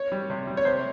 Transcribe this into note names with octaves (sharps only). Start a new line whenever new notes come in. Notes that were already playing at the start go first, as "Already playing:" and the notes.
Already playing: C#5
G3
C3
G3
C#5
C3 C5